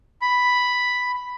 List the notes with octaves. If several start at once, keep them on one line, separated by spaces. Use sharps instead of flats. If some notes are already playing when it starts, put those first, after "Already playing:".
B5